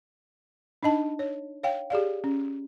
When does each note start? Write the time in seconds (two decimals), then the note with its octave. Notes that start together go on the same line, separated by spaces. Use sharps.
0.83 D4 D#4 D#5 A5
1.19 C#5
1.63 C#5 F5 G5
1.90 G4 G#4 D5 F5
2.24 C#4